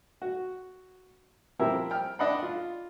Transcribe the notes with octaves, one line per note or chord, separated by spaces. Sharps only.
F#4
F3 C4 E4 G4 A#4 E5
G5 F6
D4 D#5 F#5 B5
F4